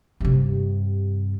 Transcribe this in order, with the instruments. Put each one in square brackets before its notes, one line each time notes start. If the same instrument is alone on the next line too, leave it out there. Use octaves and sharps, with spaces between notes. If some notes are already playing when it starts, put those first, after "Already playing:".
[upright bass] G2 C3